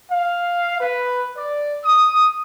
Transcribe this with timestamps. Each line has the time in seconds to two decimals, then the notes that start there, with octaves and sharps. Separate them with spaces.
0.11 F5
0.79 B4
1.37 D5
1.85 D#6